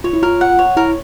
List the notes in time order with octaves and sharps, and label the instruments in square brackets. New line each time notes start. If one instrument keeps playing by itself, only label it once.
[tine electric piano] F4 [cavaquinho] C#5
[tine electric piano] E4
[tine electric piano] F4 [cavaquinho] A#4
[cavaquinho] F#5
C#5
[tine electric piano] E4 [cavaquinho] A#4